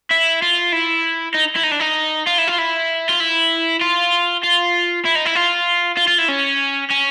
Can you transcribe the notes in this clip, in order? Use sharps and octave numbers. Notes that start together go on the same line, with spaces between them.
E4
F4
E4
D#4
E4
D#4
D4
D#4
F4
E4
F4
E4
F4
E4
F4
F4
E4
D#4
E4
F4
F4
F4
E4
C#4
C#4